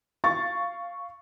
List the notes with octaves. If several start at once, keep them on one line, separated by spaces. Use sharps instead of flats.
F5 C#6 A6